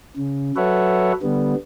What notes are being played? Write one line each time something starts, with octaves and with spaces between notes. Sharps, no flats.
C#3
F#3 A4 B4 C#5 E5 F#5
D3 G3 B3